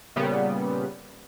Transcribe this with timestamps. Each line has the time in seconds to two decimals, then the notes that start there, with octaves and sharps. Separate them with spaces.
0.16 A#2 C#3 G3 B3